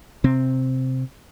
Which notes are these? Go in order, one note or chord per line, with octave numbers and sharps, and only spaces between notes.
C3 C4